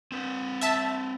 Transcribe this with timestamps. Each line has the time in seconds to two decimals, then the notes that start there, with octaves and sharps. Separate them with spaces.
0.12 C4 B4
0.61 E5 A5